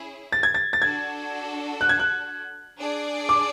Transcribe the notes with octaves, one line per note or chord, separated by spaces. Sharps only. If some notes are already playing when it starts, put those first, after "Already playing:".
Already playing: C#4 E4 G#4
A6
G#6
A6
A6
D4 F#4 A4 G#6
F#6
G#6
F#6
D4 G#4 D5
D6